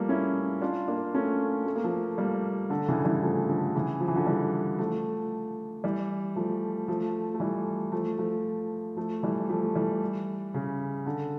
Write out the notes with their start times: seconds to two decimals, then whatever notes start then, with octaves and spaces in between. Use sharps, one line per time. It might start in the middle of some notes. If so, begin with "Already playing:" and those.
Already playing: F3 G3 A3 A#3
0.09 C#4 E4
0.62 D4 F4
0.88 A#3 D4
1.14 A3 C#4
1.66 A3
1.76 A#3
1.84 F3 A3
2.18 G3 A#3
2.70 D3
2.88 C#3 E3
3.05 E3 G3
3.22 F3 A3
3.48 D3 F3
3.75 C#3 E3
4.00 F3
4.08 E3
4.16 D3 F3
4.27 E3 G3
4.79 F3 A3
5.84 E3 G3
6.36 F3 A3
6.88 F3 A3
7.35 A3
7.40 E3 G3
7.92 F3 A3
8.18 F3 A3
8.96 F3 A3
9.23 E3 G3
9.49 F3 A3
9.75 E3 G3
10.54 C#3
11.06 D3